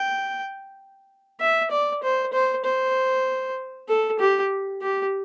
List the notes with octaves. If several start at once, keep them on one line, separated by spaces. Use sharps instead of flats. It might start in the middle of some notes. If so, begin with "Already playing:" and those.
Already playing: G5
E5
D5
C5
C5
C5
A4
G4
G4